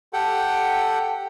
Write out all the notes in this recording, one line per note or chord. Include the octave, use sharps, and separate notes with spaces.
G4 A4 F#5 G5